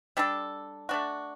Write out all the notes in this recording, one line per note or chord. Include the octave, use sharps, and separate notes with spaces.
G3 D4 A4
A3 D4 F#4